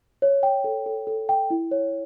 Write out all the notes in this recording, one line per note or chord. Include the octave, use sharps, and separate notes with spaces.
C#5
G5
A4
A4
A4
G5
E4
C#5